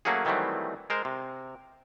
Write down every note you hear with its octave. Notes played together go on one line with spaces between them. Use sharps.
F#3 A3 A#3 C#4 F#4 G#4
D#3 E3 F#3 G3 A3 C4
G#3 A#4 C5
C3